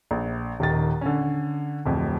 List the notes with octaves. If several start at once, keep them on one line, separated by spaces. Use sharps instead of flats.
A#1
D#1 D#3 A6
D3 C#4
D1 F2